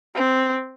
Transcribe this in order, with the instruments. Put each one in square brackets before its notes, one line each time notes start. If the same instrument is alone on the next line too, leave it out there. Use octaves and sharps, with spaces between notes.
[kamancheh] C4